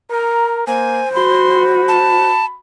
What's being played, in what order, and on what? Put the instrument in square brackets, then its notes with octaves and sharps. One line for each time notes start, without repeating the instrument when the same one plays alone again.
[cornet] A#4 [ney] A#5
[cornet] A#3 [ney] C5 [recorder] G#5
[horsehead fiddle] F#4 [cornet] B5 [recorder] C6
[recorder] A5